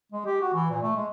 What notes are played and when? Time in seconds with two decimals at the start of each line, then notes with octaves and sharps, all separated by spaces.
0.12 G#3
0.25 G4
0.41 F#4
0.53 E3
0.70 A#2
0.82 A3
0.96 G#3